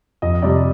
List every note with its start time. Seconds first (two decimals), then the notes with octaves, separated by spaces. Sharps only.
0.22 F2 D#5
0.42 C3 G3 D5